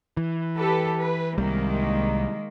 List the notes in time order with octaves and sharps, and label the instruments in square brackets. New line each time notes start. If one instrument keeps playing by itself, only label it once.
[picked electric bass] E3
[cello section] G4 A4 B4
B4
[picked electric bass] C2 G3 [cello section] D#3 G#3 A#3